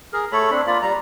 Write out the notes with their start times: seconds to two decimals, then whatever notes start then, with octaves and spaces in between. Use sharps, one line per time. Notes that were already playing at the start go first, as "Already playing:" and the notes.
0.13 G#4 A#4
0.32 A3 A4 C#5 B5
0.51 C4 D4 B5
0.67 A#3 F4 D5 B5
0.82 G3 A#5